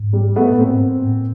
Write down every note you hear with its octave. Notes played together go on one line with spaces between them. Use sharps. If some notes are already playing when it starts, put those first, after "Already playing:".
Already playing: G#2
G3
A3 B3
A#2
A2 A#3 C4
G#2
A2
A2